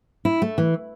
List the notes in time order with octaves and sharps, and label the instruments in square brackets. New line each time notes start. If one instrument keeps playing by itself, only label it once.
[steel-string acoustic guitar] E4
A3
E3